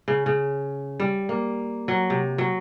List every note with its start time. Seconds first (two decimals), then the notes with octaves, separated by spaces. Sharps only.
0.08 C#3
0.26 C#3
1.00 G3
1.29 A#3
1.88 F#3
2.10 C3
2.38 F#3